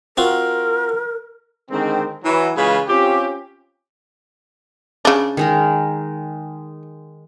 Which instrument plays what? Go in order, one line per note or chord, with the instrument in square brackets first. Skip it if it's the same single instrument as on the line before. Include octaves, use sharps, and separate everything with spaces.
[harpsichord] C4 F4 F#4 [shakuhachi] A#4
[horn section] D3 D#3 G#3 C4
E3 F#3
C#3 E3 G#3 F4 G#4 B4
C4 C#4 F4 G4
[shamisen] C#3 D4
[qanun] D#3 G#3 A#4